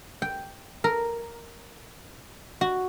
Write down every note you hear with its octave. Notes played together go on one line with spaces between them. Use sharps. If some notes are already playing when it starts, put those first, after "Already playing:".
G5
A#4
F#4